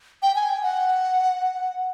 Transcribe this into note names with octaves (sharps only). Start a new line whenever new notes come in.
G5
G#5
G5
F#5